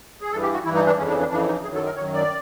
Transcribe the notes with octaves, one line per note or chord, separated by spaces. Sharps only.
G#4
G2 E3 A4
G4
F#4
G2 E3 E4
D#4
D4
F2 C#3 E3 C#4
D4
D4
F2 C#3 E3 D4
D#4
F#2 D#3 F#3 G#4
A4
A#4
F#2 D#3 F#3 C#5
D5